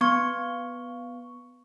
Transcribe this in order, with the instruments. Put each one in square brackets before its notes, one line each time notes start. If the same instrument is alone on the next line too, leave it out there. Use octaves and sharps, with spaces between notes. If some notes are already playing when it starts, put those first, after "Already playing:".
[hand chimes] B3 C#6